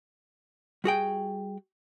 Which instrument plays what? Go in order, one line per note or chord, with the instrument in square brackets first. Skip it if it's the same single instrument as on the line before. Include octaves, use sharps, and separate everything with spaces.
[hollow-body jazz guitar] G3 F#4 G#4 G5